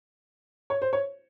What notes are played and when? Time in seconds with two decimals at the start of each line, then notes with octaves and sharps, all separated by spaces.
0.70 C#5
0.82 C5
0.93 C#5